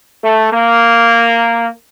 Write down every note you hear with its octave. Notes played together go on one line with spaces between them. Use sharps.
A3
A#3